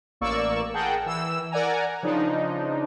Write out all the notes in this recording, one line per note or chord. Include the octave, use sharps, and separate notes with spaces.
A1 A#3 D5 C#6 E6
G#4 A#4 F#5 G5 A5
E3 E6
A#4 D5 F#5 G#5 A#5
C#3 F3 D4 D#4